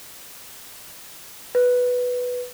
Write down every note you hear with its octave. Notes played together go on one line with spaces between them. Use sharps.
B4